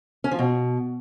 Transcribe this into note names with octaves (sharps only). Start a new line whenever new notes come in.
C#4
F3
B2